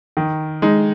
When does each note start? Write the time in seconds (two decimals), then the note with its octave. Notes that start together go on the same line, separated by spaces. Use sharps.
0.17 D#3
0.62 G#3 D#4